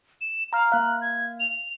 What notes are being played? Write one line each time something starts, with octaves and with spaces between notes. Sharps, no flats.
E7
F5 A#5 F6
A#3 F5 F#6
G#6
F7